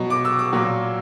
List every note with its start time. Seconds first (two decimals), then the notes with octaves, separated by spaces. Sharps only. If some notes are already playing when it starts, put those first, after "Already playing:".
Already playing: B2 F#3
0.10 D6
0.25 E6
0.39 D6
0.53 A#2 F#3